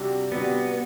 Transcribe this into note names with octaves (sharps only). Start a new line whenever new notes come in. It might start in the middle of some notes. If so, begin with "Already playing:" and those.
Already playing: C3 G3 D4 F#4
C3 G3 B3 D4 F#4